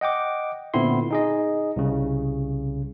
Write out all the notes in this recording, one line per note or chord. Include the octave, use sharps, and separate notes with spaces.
D#5 F#5 G5 D6
A#2 D3 B3 C4 E4 C6
D#4 G#4 D#5
C2 C#3